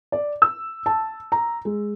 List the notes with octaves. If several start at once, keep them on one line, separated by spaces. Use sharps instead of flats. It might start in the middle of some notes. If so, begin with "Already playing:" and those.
D5
E6
A5
A#5
G#3